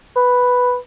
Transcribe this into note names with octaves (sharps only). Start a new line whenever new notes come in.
B4